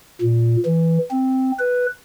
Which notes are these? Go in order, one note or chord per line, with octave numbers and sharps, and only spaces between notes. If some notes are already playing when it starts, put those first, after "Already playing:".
A#2
E3
C4
B4